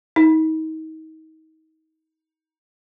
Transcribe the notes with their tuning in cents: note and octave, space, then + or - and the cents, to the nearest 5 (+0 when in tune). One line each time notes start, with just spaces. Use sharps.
D#4 +30